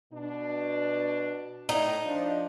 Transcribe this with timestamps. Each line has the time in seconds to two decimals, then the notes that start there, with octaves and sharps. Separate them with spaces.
0.12 B2 D4
1.69 A2 D#4
2.04 F3 D4